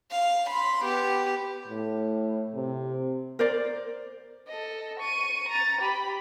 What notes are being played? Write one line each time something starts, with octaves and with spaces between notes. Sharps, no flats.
F5
B5 C6
B3 G4
A2
C3
A#4 C5 D5
A4 D#5
C#6 D#7
A#5 A6
G4 B5